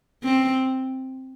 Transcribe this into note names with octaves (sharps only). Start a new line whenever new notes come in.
C4